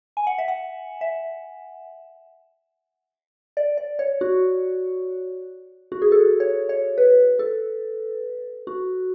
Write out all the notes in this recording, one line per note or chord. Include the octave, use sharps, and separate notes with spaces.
G#5
F#5
E5
F#5
E5
D5
D5
C#5
F#4
F#4
G#4
A4
C#5
C#5
B4
A4
F#4